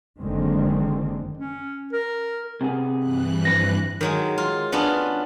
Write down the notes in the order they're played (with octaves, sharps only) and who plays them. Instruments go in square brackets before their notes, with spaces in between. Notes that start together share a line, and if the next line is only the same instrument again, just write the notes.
[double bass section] F#1 D3 D#3 G#3 C4
[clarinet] C#4
A#4
[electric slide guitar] C3 B3 G#4
[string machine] G2 E3 F#6
[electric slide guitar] F2 B4 C5 [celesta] A#6
[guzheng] D#3 F#3 G#3
F4
B3 C#4 D4 F4